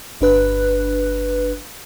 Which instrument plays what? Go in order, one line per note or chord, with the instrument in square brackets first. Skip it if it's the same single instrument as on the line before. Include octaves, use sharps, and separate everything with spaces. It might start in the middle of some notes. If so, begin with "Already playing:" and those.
[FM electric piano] G1 D4 B4 F#6